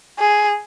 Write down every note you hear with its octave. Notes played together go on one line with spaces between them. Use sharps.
G#4